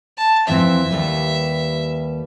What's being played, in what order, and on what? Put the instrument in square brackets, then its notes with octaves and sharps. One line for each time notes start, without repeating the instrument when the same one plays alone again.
[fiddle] A5
[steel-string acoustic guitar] F2 E3 C4 [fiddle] E5
[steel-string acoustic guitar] D#2 G3 B4